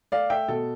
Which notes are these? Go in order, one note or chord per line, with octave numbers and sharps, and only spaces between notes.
A3 D5 F5
A3 E5 G5
B2 A4